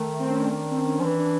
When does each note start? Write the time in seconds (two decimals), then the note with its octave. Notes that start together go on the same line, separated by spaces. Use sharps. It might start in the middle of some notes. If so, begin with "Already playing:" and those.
Already playing: D#3 A3
0.19 C4
0.29 C#4
0.38 D4
0.48 D#3
0.71 C4
0.77 C#4
1.00 F3
1.04 E3 D4
1.18 D4